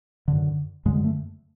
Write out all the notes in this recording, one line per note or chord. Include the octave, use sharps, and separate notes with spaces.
F#2 D3
F#2 D3 G#3
A3